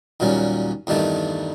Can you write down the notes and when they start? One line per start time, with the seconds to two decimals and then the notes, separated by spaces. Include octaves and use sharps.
0.20 D#2 A#2 F#3 G3 C#4
0.87 E2 G2 D#3 G3 A3